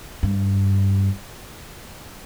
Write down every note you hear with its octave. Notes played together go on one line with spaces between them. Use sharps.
G2